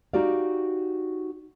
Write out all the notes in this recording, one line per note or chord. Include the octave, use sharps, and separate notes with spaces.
D#4 F#4 G4 D5 F5